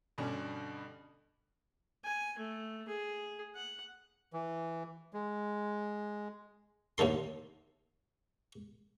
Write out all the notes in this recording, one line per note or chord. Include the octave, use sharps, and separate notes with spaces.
G2 B2 D3 G3 C#4
G#5
A3
G#4
F#5
E3
G#3
D#2 A2 D3 A4 C6